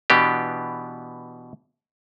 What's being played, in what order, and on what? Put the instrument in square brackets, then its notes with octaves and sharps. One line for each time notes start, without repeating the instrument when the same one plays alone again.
[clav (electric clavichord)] B2 E3 B3 D4 G4